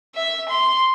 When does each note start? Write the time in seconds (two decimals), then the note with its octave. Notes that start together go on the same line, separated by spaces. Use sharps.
0.15 E5
0.49 C6